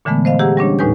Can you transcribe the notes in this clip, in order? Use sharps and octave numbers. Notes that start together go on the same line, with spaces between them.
A#2 D3 E3 G#3 A3 B3
C5 D#5 F5
G4 G#4 F#5 A#5 E6
G3 C#4 D4 C#5
D#2 A2 D#4 B4 G#5 G6